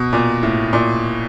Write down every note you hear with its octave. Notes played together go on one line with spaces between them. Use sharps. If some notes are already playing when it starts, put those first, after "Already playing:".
Already playing: B2
A#2
A2
A#2